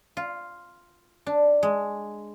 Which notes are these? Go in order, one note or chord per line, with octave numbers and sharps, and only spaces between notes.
F4
D4
G#3